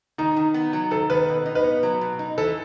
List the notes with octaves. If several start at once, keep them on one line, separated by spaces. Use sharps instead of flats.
D#3 D#4
D#3
B3
F#3
D#3 A4
D#3 B4
B2
D#4
B4
B3
F#3
B2
D#4
E3 A4